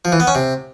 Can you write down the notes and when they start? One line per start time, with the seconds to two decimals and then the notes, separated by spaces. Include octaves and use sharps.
0.05 F3
0.12 E3
0.20 B3
0.27 C#4
0.35 C3